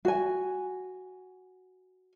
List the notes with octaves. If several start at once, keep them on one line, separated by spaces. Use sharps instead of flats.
F#4 G#5